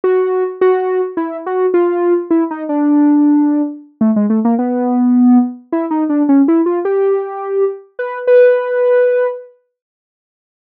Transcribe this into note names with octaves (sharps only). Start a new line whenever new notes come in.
F#4
F#4
E4
F#4
F4
E4
D#4
D4
A3
G#3
A3
A#3
B3
E4
D#4
D4
C#4
E4
F4
G4
B4
B4